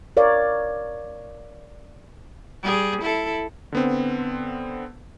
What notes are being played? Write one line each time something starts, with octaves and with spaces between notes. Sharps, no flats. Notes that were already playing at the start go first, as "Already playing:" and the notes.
A#4 C#5 D5 F5
G3 G#4
E4 A4
D3 B3 C4